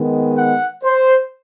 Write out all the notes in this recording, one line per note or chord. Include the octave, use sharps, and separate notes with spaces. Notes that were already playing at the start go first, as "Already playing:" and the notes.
Already playing: D#3 G#3 B3
F#5
C5